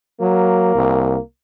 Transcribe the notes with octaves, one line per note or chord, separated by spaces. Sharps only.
F#3 A#3
C2